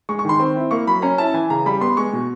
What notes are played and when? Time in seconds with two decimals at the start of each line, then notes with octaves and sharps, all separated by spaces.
0.09 G#3 C#6
0.19 C#6
0.25 D#3 C6
0.40 C4
0.56 E4
0.71 A#3 C#6
0.87 F#3 B5
1.02 C#4 A#5
1.18 E4 A5
1.34 E3 G#5
1.50 C#3 A#5
1.66 G3 B5
1.81 B3 C6
1.97 G#3 C#6
2.13 B2